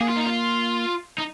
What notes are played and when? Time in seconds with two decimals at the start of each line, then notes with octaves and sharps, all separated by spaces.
0.01 A#3 G#4
0.09 F4
0.17 D#4
0.25 F4
1.18 D#4